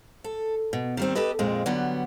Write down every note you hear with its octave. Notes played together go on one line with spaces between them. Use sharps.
A4
B2
D#3 G3 C4
G4 A4 B4 D#5
F2 A#2 G#3 C4
D3 F#3 G3 B3